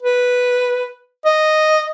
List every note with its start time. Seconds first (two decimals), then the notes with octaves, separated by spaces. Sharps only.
0.03 B4
1.25 D#5